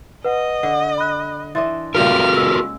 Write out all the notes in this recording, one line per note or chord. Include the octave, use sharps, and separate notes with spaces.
B4 D#5 F#5
D3 F#5
B5 F#6
E3 D4 D#5 E5 C6 A6
C#3 G3 A#3 F4 F#4 A#4 F6
G#3 E6